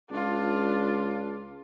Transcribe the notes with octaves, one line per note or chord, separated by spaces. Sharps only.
C#2 D4 F4